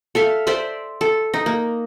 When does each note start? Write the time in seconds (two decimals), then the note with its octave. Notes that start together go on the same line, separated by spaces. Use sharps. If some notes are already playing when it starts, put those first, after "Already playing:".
0.15 A4 E5 F5
0.47 C5 D5 E5 C6
1.01 A4
1.34 D#4
1.46 A#3